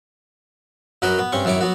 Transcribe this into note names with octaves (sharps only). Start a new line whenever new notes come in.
F#2 F#3 F#4 A#4 B4 D#5
B3
G2 C4 C#4 C#6
F#2 D#3 E4 C#5 D6
F#3 B3 F#4